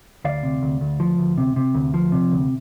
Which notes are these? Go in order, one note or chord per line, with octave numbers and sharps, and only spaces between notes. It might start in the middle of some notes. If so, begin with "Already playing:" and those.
D2 D5 F5
C3
D2
D2
F3
D2
C3
C3
D2
F3
C3
D2